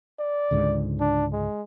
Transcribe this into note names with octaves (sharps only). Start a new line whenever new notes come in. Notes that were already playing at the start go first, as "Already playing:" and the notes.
D5
C#2 G#2 D3
D4
G#3